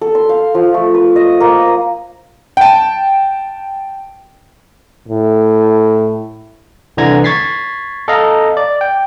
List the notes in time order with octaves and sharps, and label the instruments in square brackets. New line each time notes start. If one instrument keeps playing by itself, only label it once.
[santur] A4
C6
F5
F3
A3
B4
D#5
A#3
D#6
[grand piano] G5 A5
[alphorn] A2
[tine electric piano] C2 D3 E3 A#5 G#6 A#6
C#6 G#6 A6 B6 C7
A4 D#5 F5 A#5
D5
G5